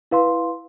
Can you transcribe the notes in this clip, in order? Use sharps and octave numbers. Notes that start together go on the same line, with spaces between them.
E4 B4 F5 C6